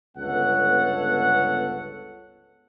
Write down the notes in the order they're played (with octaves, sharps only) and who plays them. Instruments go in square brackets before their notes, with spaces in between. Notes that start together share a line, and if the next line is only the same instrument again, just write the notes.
[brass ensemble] G1 C#2 B3 A4 C#5 F#5